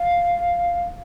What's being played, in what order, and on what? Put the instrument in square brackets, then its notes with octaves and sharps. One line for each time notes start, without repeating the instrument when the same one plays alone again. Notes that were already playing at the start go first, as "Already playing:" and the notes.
Already playing: [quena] F5